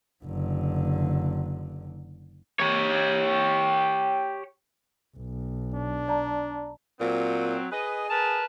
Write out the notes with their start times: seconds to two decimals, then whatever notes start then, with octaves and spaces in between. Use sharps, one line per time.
0.24 F#1 D3
2.59 G4 C#5
5.17 B1
5.74 D4
6.08 D5 A5 A#5
7.00 A#2 F#3 C4
7.72 G#4 B4 D#5
8.10 A#4 B4 A5